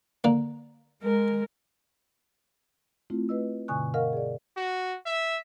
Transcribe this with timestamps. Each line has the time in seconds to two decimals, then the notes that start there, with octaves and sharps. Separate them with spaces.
0.24 D3 A#3
1.02 G#3 A#4
3.10 A3 C4 E4 F4
3.29 A3 B4 D#5 E6
3.68 G2 B2 D3 G#5 C#6 F#6
3.94 A#4 D#5 F5 F#5 C#6 F6
4.13 G#4 D5
4.57 F#4
5.06 E5